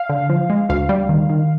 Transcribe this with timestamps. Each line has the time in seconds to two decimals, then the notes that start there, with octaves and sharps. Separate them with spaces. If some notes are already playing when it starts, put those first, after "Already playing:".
Already playing: F5
0.09 D3
0.29 F3
0.50 G#3
0.69 D2 F5
0.89 G3
1.09 D#3
1.29 D#3